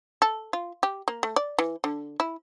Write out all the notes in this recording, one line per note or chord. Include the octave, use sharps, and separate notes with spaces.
A4
F4
G4
A#3
A3
D5
E3
D3
E4